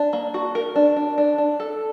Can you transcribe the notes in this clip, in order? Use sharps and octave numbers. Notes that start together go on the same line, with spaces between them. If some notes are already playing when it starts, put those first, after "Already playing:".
Already playing: D4
A#3
F#4
A#4
D4
D4
D4
D4
A4